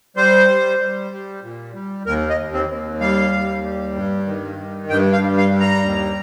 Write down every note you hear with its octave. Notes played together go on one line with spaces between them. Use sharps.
G3 C5
G3
G3
G3
A#2
G3
D#2 A#4
D#5
D#2
C4
D#2
G3 F5
D#2
G3
G2
D#3
G2
G2 G5
F5
G3
F5
G3
A#5
D#2